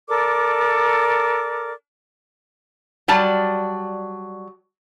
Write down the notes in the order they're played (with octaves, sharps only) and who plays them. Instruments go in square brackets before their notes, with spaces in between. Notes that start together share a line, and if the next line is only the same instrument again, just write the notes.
[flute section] A4 A#4 D5 D6
[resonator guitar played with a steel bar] F#3 G3 D5 A5